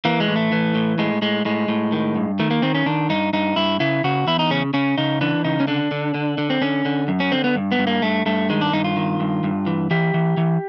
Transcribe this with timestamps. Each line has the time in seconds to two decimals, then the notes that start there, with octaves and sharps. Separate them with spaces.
0.05 E3 A#3
0.20 G#3
0.28 A2
0.36 A3
0.52 E3
0.75 A2
0.98 A2 G#3
1.22 A2 G#3
1.45 A2 G#3
1.69 A2
1.92 D#3
2.16 G2
2.39 D#3 A3
2.51 A#3
2.62 D#3 C4
2.75 C#4
2.86 D#3 D4
3.09 G2 D#4
3.33 G2 D#4
3.56 G2 E4
3.80 C#3 E4
4.04 C#3 F#4
4.27 E2 E4
4.39 D#4
4.51 C#3 C#4
4.74 C#3 C#4
4.98 C#3 D#4
5.21 E3 D4
5.44 C#3 D#4
5.60 C#4
5.67 D3 D4
5.91 D3
6.15 D3
6.38 D3
6.50 C4
6.61 D3 C#4
6.85 D3
7.08 F#2
7.20 C#4
7.32 D3 C4
7.44 B3
7.56 G2
7.72 B3
7.79 G2
7.87 A#3
8.02 G2 A3
8.26 G2 A3
8.49 D#3 G#3
8.61 D4
8.73 G2 D#4
8.84 F4
8.97 D#3
9.20 G2
9.44 G2
9.67 E3
9.91 E3 G4
10.14 E3
10.37 E3